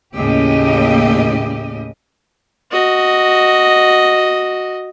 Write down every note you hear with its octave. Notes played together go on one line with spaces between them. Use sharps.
D#2 A2 C#3 G4 D#5
F#4 D#5